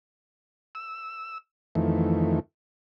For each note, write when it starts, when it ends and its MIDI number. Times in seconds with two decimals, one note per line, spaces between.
0.75 1.38 88
1.75 2.40 41
1.75 2.40 51
1.75 2.40 52
1.75 2.40 57